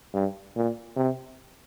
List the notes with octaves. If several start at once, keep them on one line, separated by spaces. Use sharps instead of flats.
G2
A#2
C3